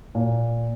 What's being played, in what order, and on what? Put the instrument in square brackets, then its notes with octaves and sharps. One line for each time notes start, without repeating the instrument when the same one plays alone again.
[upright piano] A#2